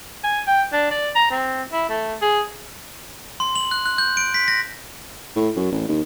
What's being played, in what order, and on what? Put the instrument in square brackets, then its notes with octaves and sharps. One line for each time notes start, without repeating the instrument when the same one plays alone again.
[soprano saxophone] G#5
G5
D4
D5
A#5
C4
E4
A3
G#4
[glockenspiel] C6
F#7
F#6
F#6
G6
D7
B6
A#6
[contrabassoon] A2
F#2
A1
D#2